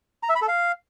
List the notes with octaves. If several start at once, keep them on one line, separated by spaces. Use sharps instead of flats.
A#5
E5
B5
A4
F5